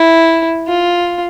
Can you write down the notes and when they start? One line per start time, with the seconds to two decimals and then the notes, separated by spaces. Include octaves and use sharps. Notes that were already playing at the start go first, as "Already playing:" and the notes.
Already playing: E4
0.68 F4